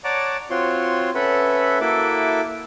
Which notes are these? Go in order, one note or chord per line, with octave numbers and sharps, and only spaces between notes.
C#5 D5 F#5 A5 A#5 D6
C4 F4 F#4 C#5 C6
C#4 A4 B4 E5 F#5
A#3 E4 F#4 A4 E5 D6